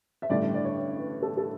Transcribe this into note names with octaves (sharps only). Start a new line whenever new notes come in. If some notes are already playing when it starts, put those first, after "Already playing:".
E5
A1 G2 D3 A3 E4 D5
D5
C#5
B4
A4
A4